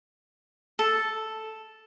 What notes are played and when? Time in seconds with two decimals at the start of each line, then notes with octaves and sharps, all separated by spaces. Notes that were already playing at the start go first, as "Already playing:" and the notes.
0.79 A4